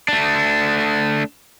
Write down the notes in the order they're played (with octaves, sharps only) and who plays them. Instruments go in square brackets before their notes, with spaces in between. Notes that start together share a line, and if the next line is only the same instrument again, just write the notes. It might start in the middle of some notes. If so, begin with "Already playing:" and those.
[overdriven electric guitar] A3 D4